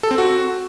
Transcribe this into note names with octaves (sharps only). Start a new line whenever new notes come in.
A4
C4
F#4